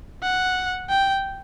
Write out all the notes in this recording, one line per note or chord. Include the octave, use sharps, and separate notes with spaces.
F#5
G5